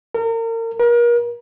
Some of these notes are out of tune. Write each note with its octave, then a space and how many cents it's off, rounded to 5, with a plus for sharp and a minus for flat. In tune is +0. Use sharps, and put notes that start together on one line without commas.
A#4 -35
A#4 +35